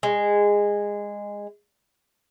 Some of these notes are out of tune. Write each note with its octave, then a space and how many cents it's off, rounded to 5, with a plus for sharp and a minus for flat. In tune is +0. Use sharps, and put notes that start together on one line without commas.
G#3 -15